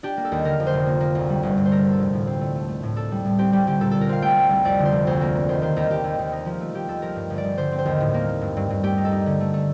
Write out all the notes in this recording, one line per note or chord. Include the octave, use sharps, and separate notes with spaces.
D4 G4
A#3
A4
D#2
D3 A#4
F2
C5
F1
A#3
A#3
D2
G3
G1
G2
C5
A3 A#4
D3
A4
F1
A2
C4
A3
A3
A3
A2
D4 A4
G3
A2
C4 G4
G3 G4
D3 G4
A#2 A4
C2 A4
A#4
C4 F5
A3 G5
A3
C2
F2 D5
D3
C5
F1
D2 C5
A#3
A#3
D#2 C5
D#3 C5
D#2 A#4
D#2 G4
D#2
D#2
D#4
F3
A3
F3 G4
D#2 A4
F3 A#4
G2
G1
D5
G1
D3 C5
C4
C5
D#2
A2
A#3
A#3
G2
G2
G2
A3 G4
D#4
A4
D#4
D3
A3
A3